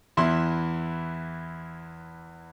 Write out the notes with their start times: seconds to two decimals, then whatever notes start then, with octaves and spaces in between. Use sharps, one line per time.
0.17 E2 E3 E4 E5 C6